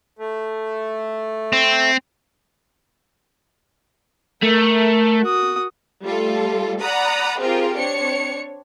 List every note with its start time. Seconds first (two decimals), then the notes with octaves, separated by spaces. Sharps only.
0.19 A3
1.53 C4
4.42 A3 A#4
5.22 F#4 D#6
6.03 G3 A3 F4 A4
6.80 D5 F#5 A#5 B5 D#6
7.40 C4 F4 G4 G#4 A#4
7.77 C4 D4 C#5 C#7